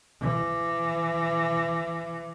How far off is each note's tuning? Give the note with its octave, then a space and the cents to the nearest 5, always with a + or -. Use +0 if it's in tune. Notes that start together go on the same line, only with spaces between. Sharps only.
E3 +30